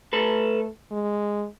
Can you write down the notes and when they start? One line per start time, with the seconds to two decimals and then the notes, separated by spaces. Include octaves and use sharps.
0.13 A3 A4 B4
0.91 G#3